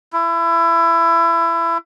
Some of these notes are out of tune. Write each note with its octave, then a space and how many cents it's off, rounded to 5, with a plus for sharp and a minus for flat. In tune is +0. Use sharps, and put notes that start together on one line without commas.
E4 +25